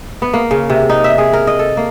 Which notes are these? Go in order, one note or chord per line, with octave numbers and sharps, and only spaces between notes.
B3
A#3
C#3
C3
D#4
E5
G#4
A#4
D#5
A4
A#3